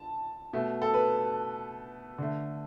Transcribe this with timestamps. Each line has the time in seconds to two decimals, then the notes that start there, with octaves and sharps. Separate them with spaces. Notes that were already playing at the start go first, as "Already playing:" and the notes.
Already playing: A5
0.53 B2 A3
0.82 A4
0.94 B4
2.18 D3 A3